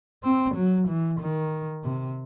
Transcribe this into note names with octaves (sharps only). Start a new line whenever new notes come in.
C4
F#3
E3
D#3
C3